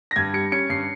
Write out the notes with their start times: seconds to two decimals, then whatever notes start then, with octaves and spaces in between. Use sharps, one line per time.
0.11 A#6
0.16 G2 G#6
0.33 G3 C#7
0.52 C#4 C#7
0.70 G2 C7